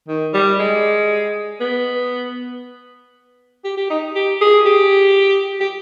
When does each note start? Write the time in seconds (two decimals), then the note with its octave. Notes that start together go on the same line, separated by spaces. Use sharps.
0.08 D#3
0.34 G3
0.59 G#3
1.60 B3
3.64 G4
3.77 G4
3.90 D#4
4.16 G4
4.41 G#4
4.66 G4
5.60 G4